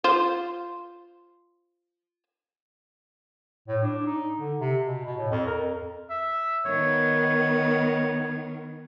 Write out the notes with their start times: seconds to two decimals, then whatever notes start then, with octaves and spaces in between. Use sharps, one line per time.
0.04 F4 C5
3.68 A2
3.83 D4
4.06 D#4
4.39 D3
4.60 C3
4.85 B2
5.05 B2
5.17 A2
5.31 F2
5.47 A#4
5.62 F2
6.10 E5
6.65 D#3 B3 C#5